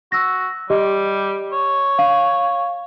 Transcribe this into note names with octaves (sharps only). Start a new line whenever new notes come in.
F#4 E6 A#6
G3 G4 D#5
C#5
F5